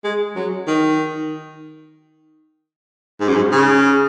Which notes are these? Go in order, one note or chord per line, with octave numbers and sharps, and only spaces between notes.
G#3
F#3
D#3
G#2
F#2
G#2
C#3